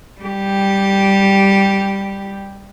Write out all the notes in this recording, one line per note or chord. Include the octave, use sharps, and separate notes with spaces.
G3 G4